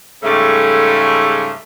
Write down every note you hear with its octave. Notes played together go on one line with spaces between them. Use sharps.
G#2 C#3 G3 A3